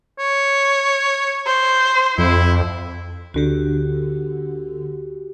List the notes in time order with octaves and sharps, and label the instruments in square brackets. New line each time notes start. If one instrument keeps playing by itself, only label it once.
[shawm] C#5
[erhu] C5
[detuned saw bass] F2 [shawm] E4
[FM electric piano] D2 D3 [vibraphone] F#4 G4